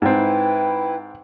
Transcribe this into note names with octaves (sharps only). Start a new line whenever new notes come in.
G#2 C4 E4 B4 G5